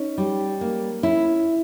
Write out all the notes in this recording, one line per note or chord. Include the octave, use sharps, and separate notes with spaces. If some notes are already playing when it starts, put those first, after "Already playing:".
Already playing: C#4 D#4
G3
A#3
C#4 E4